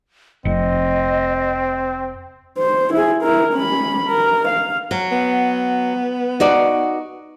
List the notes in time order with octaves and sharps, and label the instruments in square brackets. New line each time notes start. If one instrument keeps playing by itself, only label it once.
[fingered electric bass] F1 [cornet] C4 [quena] D#5
[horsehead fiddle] C5
E4 G#4
E4 A#4
C#4 B5
A#4
F5
[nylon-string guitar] F#3
[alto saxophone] B3
[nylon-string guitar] D#4 F#4 D5